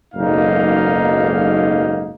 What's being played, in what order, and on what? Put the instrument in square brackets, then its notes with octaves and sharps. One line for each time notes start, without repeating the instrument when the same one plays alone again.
[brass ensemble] F#1 B1 G#2 A#3 D#4 F5